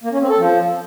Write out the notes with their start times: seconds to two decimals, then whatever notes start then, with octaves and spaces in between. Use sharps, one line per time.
0.04 A#3
0.12 C#4
0.21 C4
0.30 A4
0.38 F3